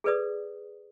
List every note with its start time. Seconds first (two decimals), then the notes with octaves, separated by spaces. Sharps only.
0.04 G#4 A4 B4 D5 D#6